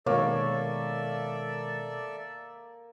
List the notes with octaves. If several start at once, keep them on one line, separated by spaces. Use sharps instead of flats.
B2 D#3 G#3 A#3 A4 C#5 D5 E5